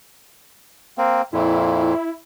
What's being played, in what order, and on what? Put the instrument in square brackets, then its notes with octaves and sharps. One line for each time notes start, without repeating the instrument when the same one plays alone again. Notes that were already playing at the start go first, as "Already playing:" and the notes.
[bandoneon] A#3 C4
[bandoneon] F2 A#2 [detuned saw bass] E4